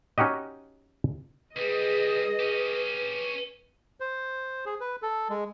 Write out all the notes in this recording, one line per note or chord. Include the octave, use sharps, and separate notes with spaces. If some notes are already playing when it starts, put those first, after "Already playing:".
C#4 D#4 F#4 G4 D#5
C#2 G3 G#4 B4 D#5
C#4 G4
C5
G#4
B4
A4
G#3